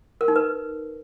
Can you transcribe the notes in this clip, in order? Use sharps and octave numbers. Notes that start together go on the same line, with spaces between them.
A#4
D#4
B4